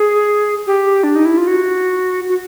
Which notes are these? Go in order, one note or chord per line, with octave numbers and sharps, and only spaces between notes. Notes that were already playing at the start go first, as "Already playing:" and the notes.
Already playing: G#4
G4
D4
D#4
E4
F4
F#4
F#4